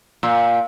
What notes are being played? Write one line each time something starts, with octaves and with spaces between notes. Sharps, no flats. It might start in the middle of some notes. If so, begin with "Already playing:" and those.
A#2